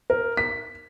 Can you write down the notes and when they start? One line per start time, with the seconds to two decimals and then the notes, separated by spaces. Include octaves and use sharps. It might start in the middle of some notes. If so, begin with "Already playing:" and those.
0.10 A#4
0.37 B6